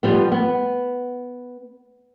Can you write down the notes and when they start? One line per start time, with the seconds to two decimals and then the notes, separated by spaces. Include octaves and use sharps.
0.03 F3 G3 B3
0.32 B3